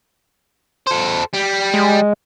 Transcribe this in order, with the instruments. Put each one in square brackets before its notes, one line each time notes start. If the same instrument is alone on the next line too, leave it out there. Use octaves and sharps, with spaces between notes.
[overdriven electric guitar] A4 C5
G3
[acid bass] G#3